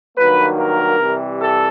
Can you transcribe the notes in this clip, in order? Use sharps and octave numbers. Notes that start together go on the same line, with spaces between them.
G2 D#3 F#3 A#3 B4
A#4
C3 E3 G3
A4